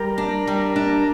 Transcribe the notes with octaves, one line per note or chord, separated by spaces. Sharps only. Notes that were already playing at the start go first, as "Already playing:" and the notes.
Already playing: G3 A#4
D4
G3
D4